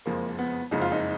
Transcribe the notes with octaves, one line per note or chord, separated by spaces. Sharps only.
F#1 F2 F3 G#3 A#3
B3
F#1 F2 F3 G#3 D#4
F4
D#4